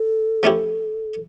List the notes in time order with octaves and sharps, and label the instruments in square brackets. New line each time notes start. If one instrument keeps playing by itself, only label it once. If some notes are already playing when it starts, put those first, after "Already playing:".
Already playing: [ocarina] A4
[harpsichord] F3 A3 C#4 E4 G4